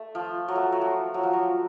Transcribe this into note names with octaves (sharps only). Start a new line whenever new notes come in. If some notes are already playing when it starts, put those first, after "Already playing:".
Already playing: A3
F3
F#3
A3
F#3
F3
F#3
F3
F#3